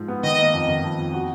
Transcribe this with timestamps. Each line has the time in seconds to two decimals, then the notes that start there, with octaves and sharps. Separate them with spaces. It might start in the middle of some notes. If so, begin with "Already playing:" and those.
Already playing: G#2 F3
0.08 B3
0.23 D#3 D#5
0.39 A#3
0.53 F2
0.68 D#3
0.84 F2
0.98 F2
1.13 F#4